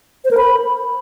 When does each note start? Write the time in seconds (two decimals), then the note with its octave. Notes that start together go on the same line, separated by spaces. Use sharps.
0.25 C5
0.31 A#4
0.38 B5